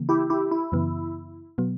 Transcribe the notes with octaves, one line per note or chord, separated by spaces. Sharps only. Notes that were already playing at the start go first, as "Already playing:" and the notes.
Already playing: C#3 E3 A#3
E4 G4
E4 G4
E4
F#2 C#3 E3 B3
B2 F#3 B3